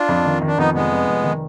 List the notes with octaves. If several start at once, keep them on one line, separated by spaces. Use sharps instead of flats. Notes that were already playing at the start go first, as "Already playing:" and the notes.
Already playing: D4 F4
F2
D#3
D#3
D4
F2 B3 D#4
F1 G#3 B3
F2
F1
D#3